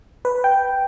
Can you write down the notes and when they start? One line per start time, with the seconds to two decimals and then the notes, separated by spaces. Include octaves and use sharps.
0.25 B4
0.44 G5